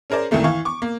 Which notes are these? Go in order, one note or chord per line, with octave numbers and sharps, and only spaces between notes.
C#4 G#4 A#4 C5 D5
C2 D#3 E3 A3 A#3
E3 F5 C#6
C#6 D6
A#3